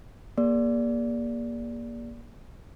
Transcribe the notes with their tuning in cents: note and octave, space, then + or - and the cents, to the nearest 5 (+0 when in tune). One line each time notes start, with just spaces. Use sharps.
A#3 +20 G#4 -25 D5 -15